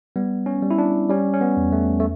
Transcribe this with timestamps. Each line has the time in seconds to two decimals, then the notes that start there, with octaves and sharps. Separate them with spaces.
0.16 G3 B3
0.46 C#4
0.62 G3
0.70 E4
0.78 D4
1.10 G3 C#4
1.34 C#4
1.41 B3
1.57 E2
1.72 A3
2.00 A3